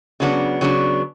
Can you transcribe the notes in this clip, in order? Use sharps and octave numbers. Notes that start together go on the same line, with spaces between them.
C#3 F#3 B3 D4
C#3 F#3 B3 D4